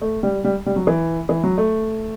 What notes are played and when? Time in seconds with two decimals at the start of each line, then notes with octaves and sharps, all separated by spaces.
0.01 A3
0.23 G3
0.44 G3
0.66 G3
0.76 F#3
0.87 E3
1.29 E3
1.44 F#3
1.58 A3